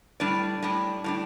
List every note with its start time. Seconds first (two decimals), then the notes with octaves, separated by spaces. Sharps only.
0.20 A2 G3 D4 D5
0.62 A2 G3 D4
1.04 A2 G3 D4